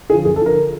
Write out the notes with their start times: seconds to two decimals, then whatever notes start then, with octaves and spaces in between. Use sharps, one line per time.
0.10 D3 G#4
0.13 F3
0.25 F#2 G#4
0.36 A4
0.42 D3 F3 A#4